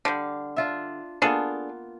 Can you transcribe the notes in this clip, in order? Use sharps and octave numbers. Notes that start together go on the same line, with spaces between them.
D3 G3 F5
D4 F4 E5
A#3 B3 D4 F4 G#4 A4